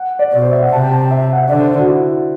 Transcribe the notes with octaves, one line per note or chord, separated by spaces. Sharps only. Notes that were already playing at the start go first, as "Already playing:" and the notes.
Already playing: F#5
D5
B2 D5
C5
E5
F#5
C3 A5
G5
A5
G5
E5
F#5
E5
D3 D5
C5
F#4
E4